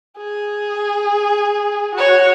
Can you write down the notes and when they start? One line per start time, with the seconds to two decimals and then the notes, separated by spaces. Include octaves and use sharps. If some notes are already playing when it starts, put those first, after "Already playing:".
0.17 G#4
1.95 F#4 C#5